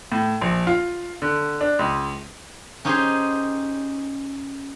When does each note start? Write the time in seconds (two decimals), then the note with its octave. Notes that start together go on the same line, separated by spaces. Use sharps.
0.12 A2
0.41 A#1
0.67 F4
1.22 D3
1.61 D4
1.79 C#2
2.85 C#4 D#4 G4 G#4 C5